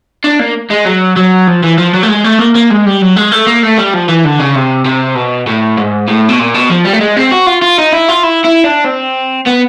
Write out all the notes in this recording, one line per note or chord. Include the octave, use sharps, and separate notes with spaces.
D4
A#3
G#3
F#3
F#3
F3
E3
F3
F#3
A3
G#3
A3
A#3
A#3
G#3
G3
F#3
G#3
A3
A#3
A3
G3
F3
E3
D3
C#3
C3
C3
B2
A2
G#2
A2
B2
A#2
B2
F3
G3
A3
G#3
C4
F#4
F4
F4
D#4
E4
F4
E4
E4
D4
C4
B3